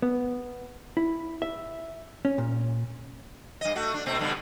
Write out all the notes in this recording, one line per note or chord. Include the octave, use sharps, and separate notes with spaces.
B3
E4
E5
C#4
A#2
G2 D#5
A3 F#4
D4
B2 A3 C4
G2 B2 D3